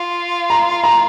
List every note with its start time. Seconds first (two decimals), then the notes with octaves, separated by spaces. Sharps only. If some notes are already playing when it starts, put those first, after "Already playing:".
Already playing: F4
0.50 A#5
0.84 A#5